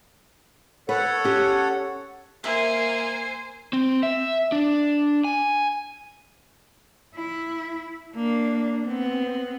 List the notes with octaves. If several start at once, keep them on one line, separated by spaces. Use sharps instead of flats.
A4 B4 C#5 F#5
C#4 G4
A#3 C5 E5 G#5
C4
E5
D4
G#5
E4
A#3 D4
B3 C4